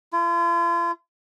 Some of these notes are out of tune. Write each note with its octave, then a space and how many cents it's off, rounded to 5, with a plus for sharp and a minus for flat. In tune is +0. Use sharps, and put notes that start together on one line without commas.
F4 -40